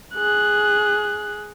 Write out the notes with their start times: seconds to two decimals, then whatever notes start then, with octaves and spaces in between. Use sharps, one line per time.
0.15 G#4 F#6